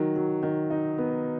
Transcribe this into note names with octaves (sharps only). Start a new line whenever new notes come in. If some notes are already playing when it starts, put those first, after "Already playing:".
Already playing: D#3 F#3
F#3
D#3
D#4
B3